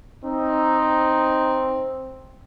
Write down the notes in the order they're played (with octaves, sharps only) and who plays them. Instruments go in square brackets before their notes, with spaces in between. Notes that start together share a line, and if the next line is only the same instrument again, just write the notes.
[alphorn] C4 [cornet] D#4